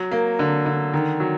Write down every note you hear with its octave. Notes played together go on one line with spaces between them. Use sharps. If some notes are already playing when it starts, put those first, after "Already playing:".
Already playing: F#3
A#3
D3
D3
D#3
F#3